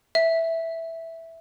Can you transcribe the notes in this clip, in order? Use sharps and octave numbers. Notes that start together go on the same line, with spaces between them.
E5